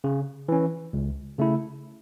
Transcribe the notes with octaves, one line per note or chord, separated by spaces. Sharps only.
C#3
E3 C#4
C#2
C#3 A3 E4